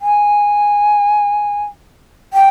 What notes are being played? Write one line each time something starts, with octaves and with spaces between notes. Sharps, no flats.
G#5
G5